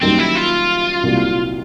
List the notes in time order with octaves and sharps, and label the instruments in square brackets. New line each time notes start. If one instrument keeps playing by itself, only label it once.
[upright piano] F#2 D#3 G3 A#3 [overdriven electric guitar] C4
[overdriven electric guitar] E4
F4
[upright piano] C2 A#2 F#3 A#3